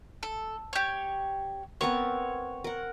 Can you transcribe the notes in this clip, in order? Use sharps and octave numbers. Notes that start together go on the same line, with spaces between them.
A4
G4 C#5
B3 C4 A#4 C#5
A#4 F#5